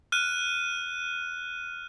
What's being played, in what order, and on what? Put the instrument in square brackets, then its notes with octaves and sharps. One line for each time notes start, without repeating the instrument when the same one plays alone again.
[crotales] F6 F#6 D#7